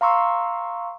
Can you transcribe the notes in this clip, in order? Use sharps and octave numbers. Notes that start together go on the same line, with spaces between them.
F5 A#5 C6 C#6 E6